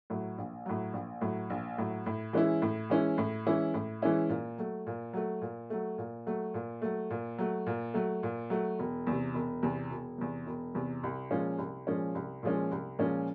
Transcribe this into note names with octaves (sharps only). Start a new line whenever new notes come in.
A2 F#3
A#1
A2 F#3
A#1
A2 F#3
A#1
A2 F#3
A2
E3 G#3 C#4 E4
A2
E3 G#3 C#4 E4
A2
E3 G#3 C#4 E4
A2
E3 G#3 C#4 E4
A#2
F#3 A3
A#2
F#3 A3
A#2
F#3 A3
A#2
F#3 A3
A#2
F#3 A3
A#2
F#3 A3
A#2
F#3 A3
A#2
F#3 A3
E1
E2 C3
E1
E2 C3
E1
E2 C3
E1
E2 C3
C2
A#2 F3 G#3 C#4
C2
A#2 F3 G#3 C#4
C2
A#2 F3 G#3 C#4
C2
A#2 F3 G#3 C#4